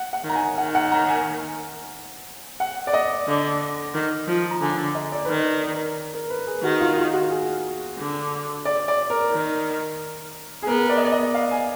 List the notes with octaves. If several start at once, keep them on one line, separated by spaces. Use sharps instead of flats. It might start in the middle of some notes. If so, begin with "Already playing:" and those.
Already playing: F#5
F#5
D#3
A#5
G#5
D#3 F#5
F#5
A#5
G#5
F#5
D5
D#5
D3
D#3
F3
A#5
D3 G#5
D#5
D5
B4
D#3 D5
A#4
A#4
B4
G#4
D#3 F#4
F4
F4
F#4
G#4
D3
D5
D5
A#4
D#3
G#4
B3 A#4
D5
D#5
D5
D#5
F5
G#5